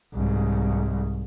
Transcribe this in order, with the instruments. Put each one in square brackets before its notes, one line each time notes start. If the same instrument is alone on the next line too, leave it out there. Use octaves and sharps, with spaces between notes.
[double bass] C2 G#2